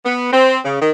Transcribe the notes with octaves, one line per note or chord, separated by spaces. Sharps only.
B3
C4
C#3
D#3